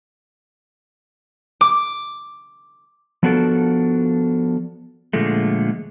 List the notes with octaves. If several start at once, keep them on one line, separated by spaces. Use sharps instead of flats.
D6
F3 B3 D4 F#4 A4 A#4
A#2 D3 F3 G#3 A3